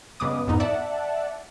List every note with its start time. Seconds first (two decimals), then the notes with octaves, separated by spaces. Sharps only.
0.20 G2 C#3 G#3 B3 D6 D#6
0.47 F2 G#2 B3 D#4
0.60 D5 E5 F#5 A5